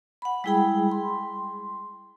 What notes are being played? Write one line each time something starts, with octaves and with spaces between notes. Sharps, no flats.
F#5 B5
G3 G#3 E4 G#4 G5 B5
C6